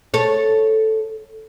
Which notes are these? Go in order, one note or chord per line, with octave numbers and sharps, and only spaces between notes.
A4 C#5